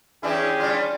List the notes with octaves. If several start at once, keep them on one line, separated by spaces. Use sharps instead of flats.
E3 C#4 D4 E4 G4 G#4
G3 D4 F4